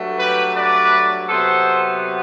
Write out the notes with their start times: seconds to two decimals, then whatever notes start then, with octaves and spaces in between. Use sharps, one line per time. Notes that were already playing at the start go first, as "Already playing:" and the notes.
Already playing: G2 F#3 A3
0.19 G4 B4
0.55 B4 D5
1.29 C3 F#3 B3 A4 C5